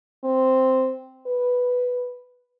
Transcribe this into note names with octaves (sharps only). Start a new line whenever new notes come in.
C4
B4